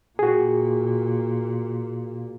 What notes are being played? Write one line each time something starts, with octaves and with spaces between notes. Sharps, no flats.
A#2 F#4 G#4